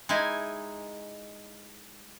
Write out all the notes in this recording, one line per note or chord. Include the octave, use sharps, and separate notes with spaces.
G#3 D#4 E4 G#5